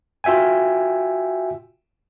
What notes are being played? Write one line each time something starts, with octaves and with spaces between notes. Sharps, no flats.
F4 F#4 E5 G5 G#5